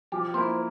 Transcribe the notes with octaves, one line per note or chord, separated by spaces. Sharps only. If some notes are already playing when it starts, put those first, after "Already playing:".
F3 G4
A#3 E4 C5